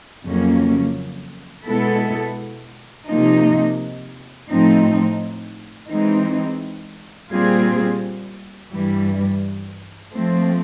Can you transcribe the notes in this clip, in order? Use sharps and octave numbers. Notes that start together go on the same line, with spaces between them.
F2 C#3 F#3 A#3 C#4
B2 G#3 B3 E4 A4
C3 F3 A#3 D#4
A2 F3 A3 C4 D#4
E3 G#3 C4 D#4
A#2 G3 C4 F4 G#4
G2 E3 G3
F3 A3 C4